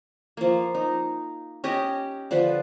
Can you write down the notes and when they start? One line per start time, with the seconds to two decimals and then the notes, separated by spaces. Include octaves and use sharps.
0.37 F3 A#3
0.75 D#4
1.64 C#4 G4 D#5
2.31 D3 F3 B4